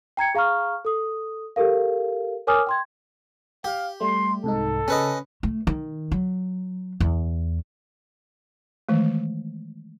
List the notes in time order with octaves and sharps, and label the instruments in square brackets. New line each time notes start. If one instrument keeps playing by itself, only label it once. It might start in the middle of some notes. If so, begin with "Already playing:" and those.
[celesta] G5 A#5 G#6 C#7
G#4 F5 A#5 C#6 F6
A4 D#6
G4 A4 A#4 F5
A#4 C#5 G#5 D6 D#6 F6
G5 C6 G#6
[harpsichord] G4 [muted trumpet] F5
[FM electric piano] G3 A3 [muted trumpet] C6
[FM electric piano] C2 G#2 D#4 [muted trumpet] A4
[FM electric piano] C#3 [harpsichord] C#4 B4 D#5
[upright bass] A3
D#3
F#3
E2
[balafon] D#3 E3 G#3 A3